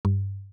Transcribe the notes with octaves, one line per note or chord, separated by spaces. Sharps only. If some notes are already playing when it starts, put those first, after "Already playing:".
G2